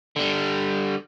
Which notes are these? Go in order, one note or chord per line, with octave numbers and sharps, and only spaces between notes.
D3 G3